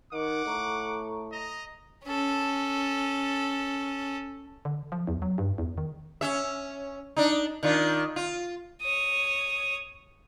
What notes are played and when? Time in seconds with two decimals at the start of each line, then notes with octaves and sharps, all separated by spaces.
0.13 D#3 F#5 D6
0.46 A2 A4 A#5 C#6
1.31 D#5 A#5
2.05 C#4 A4
4.65 D3
4.92 F3
5.07 E2
5.22 F#3
5.38 G2
5.58 E2
5.78 D#3
6.21 C#4 E5
7.17 D4 D#4
7.63 D#3 D4 F4
8.16 F4
8.82 C#5 D#6